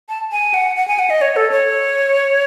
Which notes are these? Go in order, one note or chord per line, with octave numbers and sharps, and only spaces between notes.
A5
G#5
F#5
F#5
G#5
F#5
D#5
C#5
A4
C#5